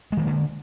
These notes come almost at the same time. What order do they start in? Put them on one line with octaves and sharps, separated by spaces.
G#3 D#3 A#3 D3